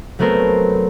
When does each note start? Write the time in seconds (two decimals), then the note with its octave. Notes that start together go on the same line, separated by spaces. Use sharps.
0.19 F#3 A3 B3 C4 A#4 C5